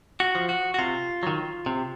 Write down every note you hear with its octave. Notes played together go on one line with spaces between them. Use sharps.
F#4
F3
F#4
F#4
C3 F4
D#3 F#3
C3